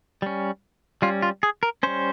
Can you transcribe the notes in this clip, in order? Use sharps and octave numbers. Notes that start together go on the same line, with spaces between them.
G3 C#4
G3 C#4 F4
F4
G#4
A#4
G3 C#4 C5